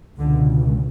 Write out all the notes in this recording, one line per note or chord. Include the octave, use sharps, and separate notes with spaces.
C#2 B2 D3